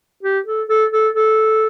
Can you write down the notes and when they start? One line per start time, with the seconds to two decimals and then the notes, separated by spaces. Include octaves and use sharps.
0.23 G4
0.47 A4
0.69 A4
0.93 A4
1.14 A4